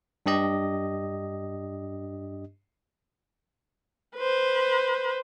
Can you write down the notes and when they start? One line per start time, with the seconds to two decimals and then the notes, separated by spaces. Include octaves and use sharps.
0.26 G2 D4 G4 D#5
4.16 B4 C5